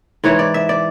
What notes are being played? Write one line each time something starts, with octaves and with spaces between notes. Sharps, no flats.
G#2 E3 C#5
D5
E5
D5